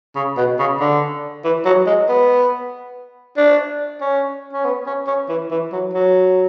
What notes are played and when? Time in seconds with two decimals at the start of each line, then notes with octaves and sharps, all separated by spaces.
0.15 C#3
0.37 B2
0.59 C#3
0.80 D3
1.44 E3
1.65 F#3
1.87 G#3
2.09 B3
3.37 D4
4.01 C#4
4.53 C#4
4.65 B3
4.86 C#4
5.07 C#4
5.29 E3
5.51 E3
5.72 F#3
5.93 F#3